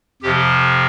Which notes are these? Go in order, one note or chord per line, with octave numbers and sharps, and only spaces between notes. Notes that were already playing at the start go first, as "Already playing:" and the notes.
F2 C3 F3 G4